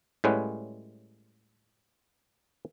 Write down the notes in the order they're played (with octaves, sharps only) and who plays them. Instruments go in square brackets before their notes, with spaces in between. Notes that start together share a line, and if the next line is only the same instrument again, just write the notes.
[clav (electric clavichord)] A2 G3 G#3 C#4 B4 F#5